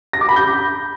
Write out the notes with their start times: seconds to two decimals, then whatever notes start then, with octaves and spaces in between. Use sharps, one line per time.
0.13 A#6
0.21 D6
0.29 B5
0.36 G6